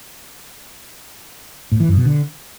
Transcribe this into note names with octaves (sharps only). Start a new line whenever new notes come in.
A2
E3
F#2
B2
D3